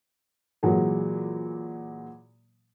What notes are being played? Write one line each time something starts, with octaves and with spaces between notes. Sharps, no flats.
A#2 E3 F#3 G#3